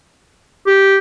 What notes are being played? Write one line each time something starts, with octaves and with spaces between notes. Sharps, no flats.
G4